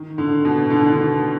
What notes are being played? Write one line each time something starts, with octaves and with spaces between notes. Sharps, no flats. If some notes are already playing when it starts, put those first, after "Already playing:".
Already playing: D#3
D3
B2
D3
D#3
D3